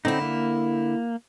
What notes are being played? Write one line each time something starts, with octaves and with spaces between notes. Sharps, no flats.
D3 C4 D#4 E4
A#3